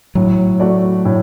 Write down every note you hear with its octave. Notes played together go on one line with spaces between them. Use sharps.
A2 F#3
A3 F#4 D5
A2